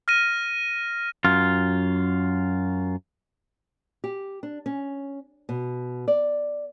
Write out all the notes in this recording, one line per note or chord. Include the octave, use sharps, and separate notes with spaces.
F6 A#6 D#7
F#2 F4
G4
D4
C#4
B2
D5